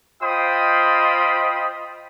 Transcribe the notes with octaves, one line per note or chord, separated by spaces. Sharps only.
F4 C5 D#5 G5 B5 D#6